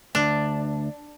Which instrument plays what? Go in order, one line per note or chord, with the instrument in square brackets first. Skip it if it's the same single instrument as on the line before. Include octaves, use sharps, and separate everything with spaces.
[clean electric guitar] D2 [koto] D4